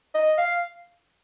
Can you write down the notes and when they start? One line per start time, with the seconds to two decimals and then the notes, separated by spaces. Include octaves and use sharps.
0.15 D#5
0.38 F5